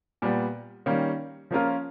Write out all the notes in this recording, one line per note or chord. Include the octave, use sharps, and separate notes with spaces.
A#2 G3 B3
D#3 G3 A#3 C#4
F3 A#3 C#4 F4 A#4